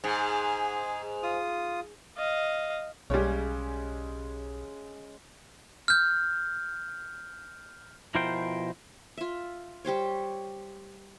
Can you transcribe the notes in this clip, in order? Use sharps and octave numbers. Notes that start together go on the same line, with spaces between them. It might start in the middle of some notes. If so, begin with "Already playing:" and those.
G#2 G#4
F4 D#6
D#5 F5
B1 C#3 G3 G#3 C#5
F6 G6
B2 F3 E4 A#4 C5 G5
F4 E5
G3 G4 C5 C#5